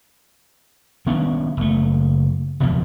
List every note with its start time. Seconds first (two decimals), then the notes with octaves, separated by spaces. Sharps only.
1.06 D#3 B3 C#4 D4
1.57 F#1 A3
2.60 F#1 E2 B2 F3